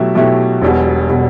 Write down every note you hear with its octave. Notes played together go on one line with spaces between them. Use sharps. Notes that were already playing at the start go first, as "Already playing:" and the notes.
Already playing: B2 F#3 A3 E4 G4
B2 F#3 A3 E4 G4
E1 E2 B2 G3
B2 G3